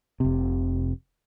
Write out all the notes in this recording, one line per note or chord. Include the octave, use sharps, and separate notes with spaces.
F1 C3